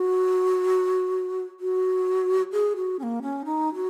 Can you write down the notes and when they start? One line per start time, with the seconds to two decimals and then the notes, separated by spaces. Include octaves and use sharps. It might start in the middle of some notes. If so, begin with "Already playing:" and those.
Already playing: F#4
1.60 F#4
2.52 G#4
2.76 F#4
2.99 C#4
3.03 A#3
3.22 C#4
3.45 D#4
3.75 F#4